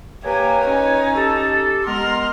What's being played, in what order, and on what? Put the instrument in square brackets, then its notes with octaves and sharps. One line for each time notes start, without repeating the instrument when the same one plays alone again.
[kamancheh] A#3 G4 [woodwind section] B4 C#5 G#5
[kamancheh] C#4 D#4
[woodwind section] G4 A4
[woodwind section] G#3 B3 A#4 [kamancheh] C6 F6